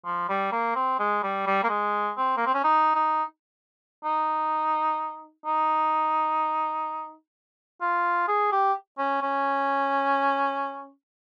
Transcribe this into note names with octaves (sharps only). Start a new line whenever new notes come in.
F3
G3
A#3
C4
G#3
G3
G3
A#3
G#3
C4
A#3
C4
C#4
D#4
D#4
D#4
D#4
F4
G#4
G4
C#4
C#4